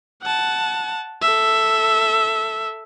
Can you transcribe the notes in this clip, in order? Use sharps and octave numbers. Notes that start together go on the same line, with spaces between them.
F#5 A5
A4 E5